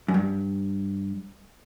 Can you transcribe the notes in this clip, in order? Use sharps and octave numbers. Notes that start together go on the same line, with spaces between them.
F#2
G2